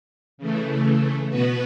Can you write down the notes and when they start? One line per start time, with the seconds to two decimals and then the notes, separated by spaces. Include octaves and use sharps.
0.38 C#3 E3 A3
1.30 B2 B3 F#4 B4